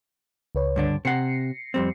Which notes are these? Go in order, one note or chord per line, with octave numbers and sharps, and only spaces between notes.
C#2 B4 C#5
G2 D3 D4
C3 F#5 A#6 C7 C#7
F2 G3 C4